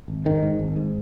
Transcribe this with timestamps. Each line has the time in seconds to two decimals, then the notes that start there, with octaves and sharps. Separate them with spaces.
0.08 G#1
0.25 G#2 D#3
0.43 G#2
0.59 G#1
0.76 G#2